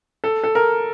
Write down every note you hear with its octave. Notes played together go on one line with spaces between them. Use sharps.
A4
A4
A#4